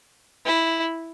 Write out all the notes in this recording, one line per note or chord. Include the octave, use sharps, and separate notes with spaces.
E4